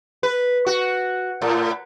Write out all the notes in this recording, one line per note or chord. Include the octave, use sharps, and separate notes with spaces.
B4
F#4
A2